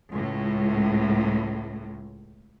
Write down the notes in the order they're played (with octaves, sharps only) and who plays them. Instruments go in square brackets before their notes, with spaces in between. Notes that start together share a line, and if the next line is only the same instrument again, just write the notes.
[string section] C#2 A2